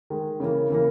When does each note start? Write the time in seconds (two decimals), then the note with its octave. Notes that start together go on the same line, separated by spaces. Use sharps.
0.10 D#3 G#3
0.40 C#3 E3 A#3
0.70 C#3 E3 A#3